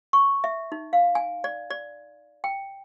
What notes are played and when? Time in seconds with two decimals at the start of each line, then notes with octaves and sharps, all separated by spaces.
0.13 C#6
0.44 E5
0.72 D#4
0.93 F5
1.15 G#5
1.44 D5
1.71 D5
2.44 G5